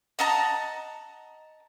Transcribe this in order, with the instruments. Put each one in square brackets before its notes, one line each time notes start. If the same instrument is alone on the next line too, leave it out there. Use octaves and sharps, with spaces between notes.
[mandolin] D#5 F#5 A5 A#5